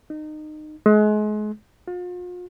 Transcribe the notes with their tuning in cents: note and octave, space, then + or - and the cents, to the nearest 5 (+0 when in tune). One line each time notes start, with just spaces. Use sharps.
D#4 -25
G#3 +35
F4 +40